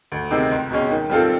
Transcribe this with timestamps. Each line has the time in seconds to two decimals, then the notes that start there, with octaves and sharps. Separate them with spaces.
0.12 D2
0.31 C3 D#3 G#3 C4
0.51 C#2
0.71 B2 G#3 C#4
0.91 D#3
1.10 G3 C4 F4 A4